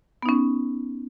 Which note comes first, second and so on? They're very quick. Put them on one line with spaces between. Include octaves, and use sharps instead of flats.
B3 D#4 C#4